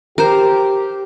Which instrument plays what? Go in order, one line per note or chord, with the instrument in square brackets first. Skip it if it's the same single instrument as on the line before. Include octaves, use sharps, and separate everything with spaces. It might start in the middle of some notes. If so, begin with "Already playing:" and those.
[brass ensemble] G4 [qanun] A#4 C5